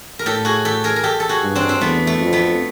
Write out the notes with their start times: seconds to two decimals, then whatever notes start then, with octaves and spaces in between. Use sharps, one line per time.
0.19 A#4
0.26 A2 G4 A4
0.45 F#4 G#4
0.65 G4 A4
0.84 G#4 A#4
0.96 A#4
1.04 G4 A4
1.20 A4
1.29 F#4 G#4
1.43 G2
1.55 C4 D4
1.69 C4
1.81 E2 A3 B3
2.07 A3
2.20 F2
2.33 A3 B3